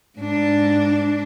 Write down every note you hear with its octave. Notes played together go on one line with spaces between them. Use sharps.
G#2 D4